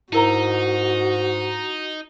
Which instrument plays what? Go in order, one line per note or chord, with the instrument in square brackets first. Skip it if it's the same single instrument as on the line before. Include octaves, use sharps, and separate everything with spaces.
[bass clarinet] G#2 [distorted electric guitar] D#4 [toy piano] E4 A#4 A#5 [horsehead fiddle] F#4